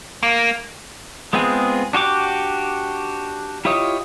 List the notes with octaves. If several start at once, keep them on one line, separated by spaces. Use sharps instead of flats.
A#3
G#3 B3 C4 F4 G#4
D4 F#4 G4 D6
E4 F4 G4 C#5 D#5